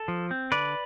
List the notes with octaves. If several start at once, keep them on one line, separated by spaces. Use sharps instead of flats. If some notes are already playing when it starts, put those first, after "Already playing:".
Already playing: A4
F3
C4
D3 B4 D5